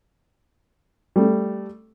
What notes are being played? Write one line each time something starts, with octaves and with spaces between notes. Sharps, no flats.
G3 A3